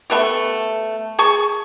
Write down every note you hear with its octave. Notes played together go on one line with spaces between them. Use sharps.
A3 B3 G4
G#4 A5 C#6